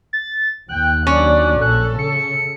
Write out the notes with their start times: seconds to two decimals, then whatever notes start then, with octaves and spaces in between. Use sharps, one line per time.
0.13 A6
0.69 D#2 G5 F#6
1.07 F#3 C#4 D4 D5
1.61 A#1 A4 F#6
1.99 C#3 C#7